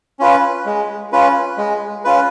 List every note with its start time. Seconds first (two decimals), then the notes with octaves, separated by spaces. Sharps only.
0.19 C#4 F4 B4
0.65 G#3
1.12 C#4 F4 B4
1.58 G#3
2.05 C#4 F4 B4